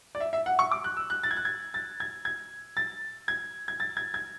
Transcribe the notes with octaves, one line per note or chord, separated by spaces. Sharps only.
D5
E5
E5
F#5
C#6
D6
F#6
E6
F#6
A6
G#6
F#6
G#6
A6
G#6
G#6
A6
G#6
G#6
A6
G#6
G#6